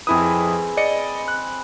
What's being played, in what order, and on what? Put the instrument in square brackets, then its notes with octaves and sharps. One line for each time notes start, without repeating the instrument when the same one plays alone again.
[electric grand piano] F2 E4 D#6 [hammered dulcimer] C4 G#4 B4
[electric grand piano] D5 D#5 C#7
F#6